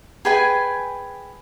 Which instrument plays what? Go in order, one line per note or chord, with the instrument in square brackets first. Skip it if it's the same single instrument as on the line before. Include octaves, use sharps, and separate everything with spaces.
[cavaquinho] G#4 B4 G5 G#5